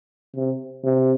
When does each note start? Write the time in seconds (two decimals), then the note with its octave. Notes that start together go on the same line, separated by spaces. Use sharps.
0.36 C3
0.84 C3